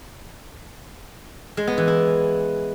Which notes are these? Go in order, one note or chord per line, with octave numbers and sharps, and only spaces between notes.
G#3
B3
E3
E4